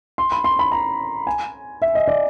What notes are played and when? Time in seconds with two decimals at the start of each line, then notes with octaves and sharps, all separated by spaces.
0.18 C6
0.32 B5
0.44 C6
0.59 B5
0.72 A#5
1.27 G#5
1.82 E5
1.95 D#5
2.08 D5